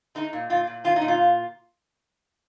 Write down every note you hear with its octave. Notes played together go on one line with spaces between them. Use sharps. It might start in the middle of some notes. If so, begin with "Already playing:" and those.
G#3 D#4
A#2
A#2 F4
A#2
C#4 F4
D#4
A#2
F4